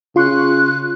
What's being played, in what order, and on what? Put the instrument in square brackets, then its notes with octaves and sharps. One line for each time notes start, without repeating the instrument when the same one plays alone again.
[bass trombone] C#3 [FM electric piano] F4 C6 C#6 [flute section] F#6